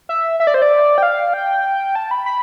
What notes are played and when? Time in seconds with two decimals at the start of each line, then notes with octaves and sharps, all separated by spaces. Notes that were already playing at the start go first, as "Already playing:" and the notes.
0.09 E5
0.40 E5
0.47 D5
0.54 C5
0.62 D5
0.98 G5
1.03 F5
1.34 G5
1.95 A5
2.11 B5
2.26 B5